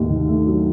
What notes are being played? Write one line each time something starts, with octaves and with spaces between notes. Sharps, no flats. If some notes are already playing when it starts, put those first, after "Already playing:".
Already playing: D#2 A3
D#3
A3
F#3